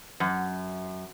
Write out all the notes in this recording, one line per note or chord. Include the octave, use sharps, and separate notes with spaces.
F#2